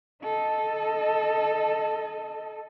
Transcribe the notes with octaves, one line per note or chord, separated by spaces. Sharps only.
A4 D#5